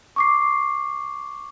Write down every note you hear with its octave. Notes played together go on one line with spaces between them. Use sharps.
C#6 D6 C7